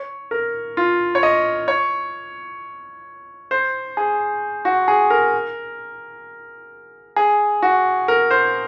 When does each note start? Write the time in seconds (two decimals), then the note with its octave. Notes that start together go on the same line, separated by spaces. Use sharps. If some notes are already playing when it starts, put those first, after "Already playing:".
Already playing: C#5
0.31 A#4
0.77 F4
1.15 C#5
1.23 D#5
1.68 C#5
3.51 C5
3.97 G#4
4.65 F#4
4.88 G#4
5.10 A#4
7.16 G#4
7.62 F#4
8.08 A#4
8.31 C5